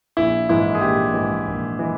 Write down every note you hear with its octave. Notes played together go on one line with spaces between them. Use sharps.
A#1 E4
G#2 E3 G#3 E4
G#4
A#1 G4
G#2 E3 G#3
A#1
E3 G#3